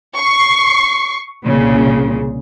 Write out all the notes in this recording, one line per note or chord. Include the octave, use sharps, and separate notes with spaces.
C#6 C7
C2 A#2 C#3